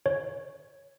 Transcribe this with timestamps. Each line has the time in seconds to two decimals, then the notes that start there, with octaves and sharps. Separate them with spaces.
0.06 C#5